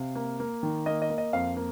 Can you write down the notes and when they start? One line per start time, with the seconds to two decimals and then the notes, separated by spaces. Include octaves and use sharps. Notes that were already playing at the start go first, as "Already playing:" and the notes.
Already playing: C3 F5
0.15 A#3
0.40 A#3
0.63 D#3
0.86 A#3 D#5
1.02 D#5
1.09 A#3
1.18 D#5
1.33 F2 F5
1.57 A#3